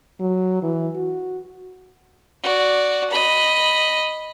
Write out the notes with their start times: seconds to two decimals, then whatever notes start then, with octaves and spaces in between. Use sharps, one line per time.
0.20 F#3
0.63 E3
0.96 F#4
2.43 F#4 D5
3.11 D#5 B5